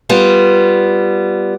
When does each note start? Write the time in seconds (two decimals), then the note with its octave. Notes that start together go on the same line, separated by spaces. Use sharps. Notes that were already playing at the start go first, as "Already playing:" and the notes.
0.09 G3 B3 F4